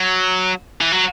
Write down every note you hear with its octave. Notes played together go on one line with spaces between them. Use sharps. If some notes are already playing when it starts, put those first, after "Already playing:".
Already playing: F#3
E3
F#3